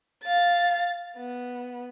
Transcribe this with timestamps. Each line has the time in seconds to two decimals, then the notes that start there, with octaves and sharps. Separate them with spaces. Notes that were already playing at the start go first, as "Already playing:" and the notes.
0.24 F5 A6
1.17 B3